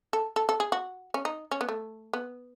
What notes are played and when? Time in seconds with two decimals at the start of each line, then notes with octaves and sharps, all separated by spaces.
0.13 A4
0.36 A4
0.49 A4
0.60 G#4
0.72 F#4
1.14 C#4
1.25 D#4
1.51 C#4
1.61 B3
1.68 A3
2.13 B3